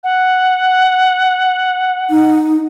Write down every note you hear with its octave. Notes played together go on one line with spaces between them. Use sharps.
F#5
D#4